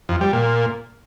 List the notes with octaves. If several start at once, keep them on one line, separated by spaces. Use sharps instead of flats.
F2
G3
A#2